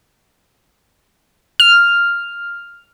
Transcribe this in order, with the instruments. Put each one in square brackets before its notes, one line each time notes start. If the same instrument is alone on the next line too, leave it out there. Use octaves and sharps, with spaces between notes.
[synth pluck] F6